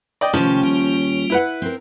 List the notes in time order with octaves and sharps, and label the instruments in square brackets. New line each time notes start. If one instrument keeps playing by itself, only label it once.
[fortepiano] D5 D#5 G5
[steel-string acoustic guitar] D#2 C#4 [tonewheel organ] C3 A3 G5 [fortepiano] F3
[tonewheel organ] G3 A#3 F4
[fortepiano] E4 B4 F#5
[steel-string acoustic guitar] C4 A#4